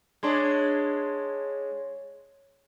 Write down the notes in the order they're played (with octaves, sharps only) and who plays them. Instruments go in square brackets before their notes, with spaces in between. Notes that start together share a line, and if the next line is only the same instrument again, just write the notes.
[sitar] G#3 D4 [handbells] C#5 C6 G#6